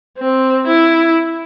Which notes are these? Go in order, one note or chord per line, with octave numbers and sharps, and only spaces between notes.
C4
E4